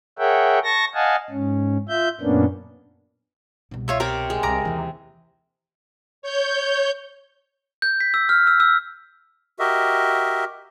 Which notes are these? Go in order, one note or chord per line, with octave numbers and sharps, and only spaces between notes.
G#4 A#4 C#5 E5 F#5 G5
A5 C#6 A#6
D#5 F5 F#5 G#5 A5
G#2 C#4
F4 E5 G6
F#2 A#2 A#3 B3 C#4 D4
C2 B2
F4 C#5 E5
C3 A#4 C#5 D6
G#3
C2 A#4 A#5 D6
D#2 E3
C#5 G6
G6
B6
E6
F6
E6
E6
F#4 G4 A#4 D#5 E5